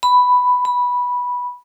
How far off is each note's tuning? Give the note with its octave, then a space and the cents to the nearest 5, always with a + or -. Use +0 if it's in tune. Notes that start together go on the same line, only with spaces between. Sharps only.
B5 +5
B5 -10